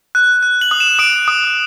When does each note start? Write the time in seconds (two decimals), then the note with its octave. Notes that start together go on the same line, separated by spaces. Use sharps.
0.15 F#6
0.43 F#6
0.61 F#7
0.71 D#6
0.80 E7
0.99 D#6 D7
1.28 D#6